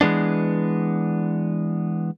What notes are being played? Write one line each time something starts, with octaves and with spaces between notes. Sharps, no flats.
E3 G#3 B3 D4